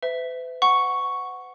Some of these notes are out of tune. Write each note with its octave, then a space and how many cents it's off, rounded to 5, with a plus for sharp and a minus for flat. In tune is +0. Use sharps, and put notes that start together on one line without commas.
B4 +45 E5 +0
F#5 +0 C#6 +0